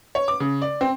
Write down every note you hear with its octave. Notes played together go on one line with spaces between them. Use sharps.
C#5
D6
C#3
D5
C4